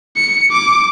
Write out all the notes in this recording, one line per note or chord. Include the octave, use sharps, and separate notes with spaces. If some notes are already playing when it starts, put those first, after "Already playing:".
C#7
D6